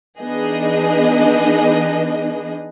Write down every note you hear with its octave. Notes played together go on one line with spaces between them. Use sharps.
E3 B3 D4 D#4 G#4 D#5